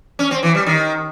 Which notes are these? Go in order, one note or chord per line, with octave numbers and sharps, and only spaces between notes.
C#4
C4
E3
G3
D#3